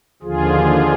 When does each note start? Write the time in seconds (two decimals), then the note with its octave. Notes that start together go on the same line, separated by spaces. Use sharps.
0.22 D#2 D3 F3 F4 G#4